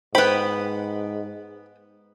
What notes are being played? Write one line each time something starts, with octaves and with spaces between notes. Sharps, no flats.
G#2 B3 B4 C5 G5 B5